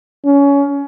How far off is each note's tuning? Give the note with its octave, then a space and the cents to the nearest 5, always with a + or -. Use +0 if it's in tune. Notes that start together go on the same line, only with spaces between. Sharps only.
C#4 +25